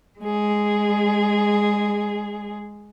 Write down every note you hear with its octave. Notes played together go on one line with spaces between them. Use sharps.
G#3 G#4